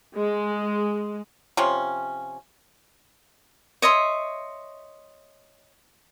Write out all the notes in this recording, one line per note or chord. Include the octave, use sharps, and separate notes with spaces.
G#3
C3 F3 C#4
C#5 D#5 E5 C6